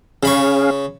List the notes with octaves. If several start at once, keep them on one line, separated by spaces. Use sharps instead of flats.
C#3 C#4 G#4 F5 B5 C#6